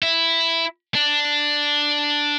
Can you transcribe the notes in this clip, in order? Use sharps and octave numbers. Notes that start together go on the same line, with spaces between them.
E4
D4